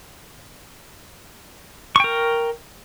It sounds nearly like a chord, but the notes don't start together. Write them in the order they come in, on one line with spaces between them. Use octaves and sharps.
C#6 G5 A#4